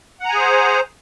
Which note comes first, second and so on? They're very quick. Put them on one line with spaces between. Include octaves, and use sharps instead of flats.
F#5 A#5 G#5 G#4 C5